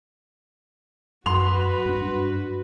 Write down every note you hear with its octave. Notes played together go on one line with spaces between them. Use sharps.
F#2 F#4 B4 C6 F7
G2 D4